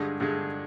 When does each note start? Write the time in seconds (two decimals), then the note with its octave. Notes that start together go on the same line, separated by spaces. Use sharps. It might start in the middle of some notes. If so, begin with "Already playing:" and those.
Already playing: G2 D3 G#3
0.20 G2 D3 G#3